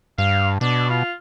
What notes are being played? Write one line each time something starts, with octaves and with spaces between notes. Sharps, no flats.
G2 F5
B2 D4
F4